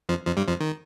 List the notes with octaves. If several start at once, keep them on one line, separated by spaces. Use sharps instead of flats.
F2 F3
F2 F3
G2 G3
F2 F3
D#3